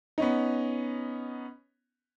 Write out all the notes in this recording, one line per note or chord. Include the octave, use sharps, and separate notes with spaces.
B3 C#4 D#4